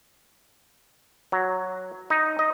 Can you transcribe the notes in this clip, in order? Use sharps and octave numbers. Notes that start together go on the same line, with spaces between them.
F#3
D#4
D#5